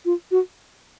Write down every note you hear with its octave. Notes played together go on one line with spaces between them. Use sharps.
F4
F#4